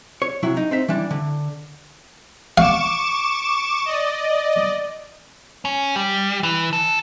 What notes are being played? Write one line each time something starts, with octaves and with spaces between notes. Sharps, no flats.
C#5
C3 F#3 E4
D#4
C4 D#4 E5
E3 G3 D4
D3
F5 C#6 D6 E7
D5 D#5
C#4
G3
E3
A4